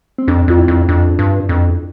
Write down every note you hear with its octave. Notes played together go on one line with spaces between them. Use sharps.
C4
F2 D4
F2 F4
E4
F2
F2 D4
G2
F2